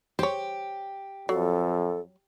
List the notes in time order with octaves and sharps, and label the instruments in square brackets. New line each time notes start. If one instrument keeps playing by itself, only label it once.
[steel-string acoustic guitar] G4 [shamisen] C5 C#5
[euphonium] F2 [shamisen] F#3 [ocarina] A4